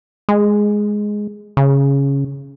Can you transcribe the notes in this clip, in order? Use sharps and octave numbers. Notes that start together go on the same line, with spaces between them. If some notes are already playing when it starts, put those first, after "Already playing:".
G#3
C#3